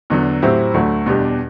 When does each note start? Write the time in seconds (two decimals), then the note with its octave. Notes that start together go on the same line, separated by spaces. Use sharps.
0.10 E2 D3 F#3
0.42 A2 F#3 C4 E4 G4
0.74 D2 D3 F#3 A3
1.06 E2 B2 G3 D4 G4